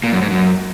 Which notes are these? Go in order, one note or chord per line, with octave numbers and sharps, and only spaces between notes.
A#2
F#2
G#2
F#2